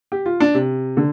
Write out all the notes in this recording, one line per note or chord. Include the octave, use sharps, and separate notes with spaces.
G4
F4
D4
C3
D3